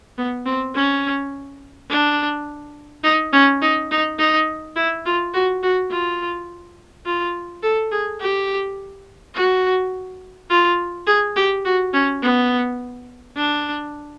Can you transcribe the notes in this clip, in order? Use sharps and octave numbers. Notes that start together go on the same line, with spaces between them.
B3
C4
C#4
D4
D#4
C#4
D#4
D#4
D#4
E4
F4
F#4
F#4
F4
F4
A4
G#4
G4
F#4
F4
G#4
G4
F#4
C#4
B3
D4